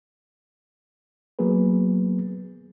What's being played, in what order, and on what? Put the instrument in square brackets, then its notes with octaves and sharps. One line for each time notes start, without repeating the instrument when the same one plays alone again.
[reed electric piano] F#3 A#3 B3 G#4 B4